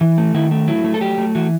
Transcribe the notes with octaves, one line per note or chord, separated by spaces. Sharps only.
E3
A3
D#3 E4
A3
F#3 E4
A3
A4
F#3 G4
A3
E3 F#4